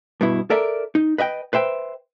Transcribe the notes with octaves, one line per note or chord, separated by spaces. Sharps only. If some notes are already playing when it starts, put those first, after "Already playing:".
G2 B2 E4
A4 A#4 D5 E5
D#4
B4 D#5 E5 G5
B4 C5 E5 G5